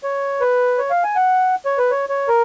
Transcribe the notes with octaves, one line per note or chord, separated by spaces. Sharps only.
C#5
B4
C#5
F5
G#5
F#5
C#5
B4
C#5
C#5
A#4